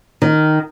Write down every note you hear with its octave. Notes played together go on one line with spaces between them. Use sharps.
D#3